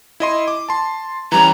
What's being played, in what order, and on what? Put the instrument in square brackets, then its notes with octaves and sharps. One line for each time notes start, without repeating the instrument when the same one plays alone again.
[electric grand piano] E4 D#5 C6
D6
A5 C6
[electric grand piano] E3 G3 C#4 [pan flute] A#5